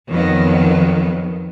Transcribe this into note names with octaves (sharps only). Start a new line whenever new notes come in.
F2 D#3 F#3 B3